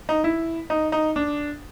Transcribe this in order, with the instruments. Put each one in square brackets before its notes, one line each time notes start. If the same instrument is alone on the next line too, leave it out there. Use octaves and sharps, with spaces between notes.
[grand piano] D#4
E4
D#4
D#4
D4